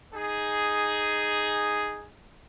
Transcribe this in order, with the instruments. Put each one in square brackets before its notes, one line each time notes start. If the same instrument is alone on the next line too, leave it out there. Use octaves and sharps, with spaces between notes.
[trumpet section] D#4 G#4